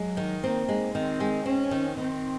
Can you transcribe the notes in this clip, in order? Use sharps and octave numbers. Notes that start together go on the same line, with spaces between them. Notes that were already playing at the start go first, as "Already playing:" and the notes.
Already playing: F#3 G#3
D#3
A#3 C4
G#3
D#3 C4
G#3
C4 C#4
D#3
D#3 C4